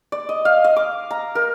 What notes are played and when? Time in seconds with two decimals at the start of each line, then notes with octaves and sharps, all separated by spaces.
0.12 D5
0.29 D#5
0.45 F5
0.64 D#5
0.76 D6
1.11 A#5
1.35 A#4